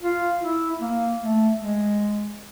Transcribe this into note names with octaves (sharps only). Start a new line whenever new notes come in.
F4
E4
A#3
A3
G#3